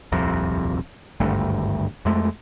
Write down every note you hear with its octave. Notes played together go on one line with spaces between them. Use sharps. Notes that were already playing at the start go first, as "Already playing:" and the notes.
D#1 C2 F2 C3
G#1 D2 G2 A3
F2 G#3 A3